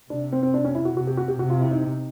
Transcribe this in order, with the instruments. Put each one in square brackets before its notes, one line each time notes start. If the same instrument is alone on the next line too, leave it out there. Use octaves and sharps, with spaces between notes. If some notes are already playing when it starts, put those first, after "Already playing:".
[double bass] C3 [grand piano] D4
[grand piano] C4
C4
D4
C#4
E4
F#4
[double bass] C3 [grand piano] F#4
[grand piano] G4
F#4
G4
[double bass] C3 [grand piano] F#4
[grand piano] F4
E4
D#4